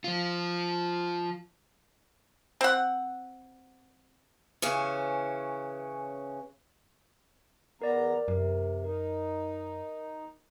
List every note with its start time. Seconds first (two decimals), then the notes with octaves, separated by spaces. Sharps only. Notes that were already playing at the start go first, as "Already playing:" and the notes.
0.04 F3 F4
2.61 C4 F#5
4.62 C#3 E3 C#4
7.82 E2 B3 A#4 D5 A#5
8.28 F#2 C3 A#4
8.84 D#4 A#4